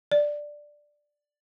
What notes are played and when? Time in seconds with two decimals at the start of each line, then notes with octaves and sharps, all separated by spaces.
0.12 D5